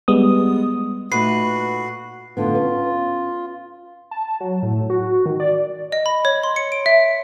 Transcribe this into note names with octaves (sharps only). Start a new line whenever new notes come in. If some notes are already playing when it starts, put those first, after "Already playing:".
G3 G#3 B3 D#6
A#2 A3 D#4 F#4 B4 C7
A2 D3 B3 F4
C#4 B4
A5
F#3
A2
F#4
D#3
D5
D#5
B5
C#5
C6
C#7
D7
E5